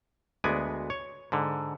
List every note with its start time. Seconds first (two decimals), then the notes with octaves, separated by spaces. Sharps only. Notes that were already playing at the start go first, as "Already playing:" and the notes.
0.44 D2 G#3 B3 D5 G#5
0.90 C#5
1.32 G#2 D3